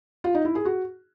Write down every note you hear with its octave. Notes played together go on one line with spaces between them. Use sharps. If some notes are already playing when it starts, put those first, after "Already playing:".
F4
D#4
E4
G#4
F#4